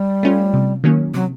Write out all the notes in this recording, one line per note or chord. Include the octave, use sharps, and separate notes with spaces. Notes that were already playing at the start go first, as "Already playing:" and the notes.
Already playing: G3
A3 C#4 F4
C3
D#3 F#3 A#3 C#4
C3 F#3